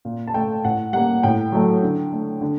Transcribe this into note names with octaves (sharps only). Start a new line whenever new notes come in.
A#2
A5
A3 G5
A2 F#5
G3 A#3 F#5
A2 G5
F#3 A3
D3
A3
D3